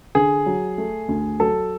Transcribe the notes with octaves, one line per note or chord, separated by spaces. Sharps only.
D3 G#4
F#3
A3
D2
F#3 A4